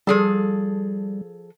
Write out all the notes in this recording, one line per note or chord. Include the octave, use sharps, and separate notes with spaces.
F3 G3 G#4 A4